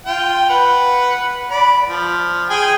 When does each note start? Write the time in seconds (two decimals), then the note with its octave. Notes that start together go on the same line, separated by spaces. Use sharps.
0.06 F4 G5
0.50 B4 F#5
1.51 D5 B5
1.87 F3
2.50 G#4 G5 G#5